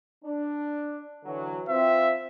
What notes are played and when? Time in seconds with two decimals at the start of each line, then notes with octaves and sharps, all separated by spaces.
0.23 D4
1.25 D3 E3 F#3
1.69 C4 F4 E5